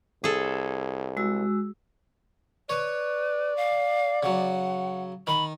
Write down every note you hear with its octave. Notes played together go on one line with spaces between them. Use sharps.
C2 G#4 A4
G#3 F#4 E6
B4 C#5 D5
F5
C#3 F#3 F#5
D#3 B5